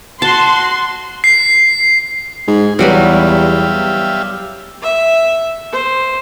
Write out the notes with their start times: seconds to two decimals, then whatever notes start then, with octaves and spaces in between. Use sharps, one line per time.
0.22 F#4 A5 C6
1.24 C7
2.48 G#2 G#4
2.79 E2 F#3 G3 G4 B4 E5 F5
4.83 E5
5.73 C5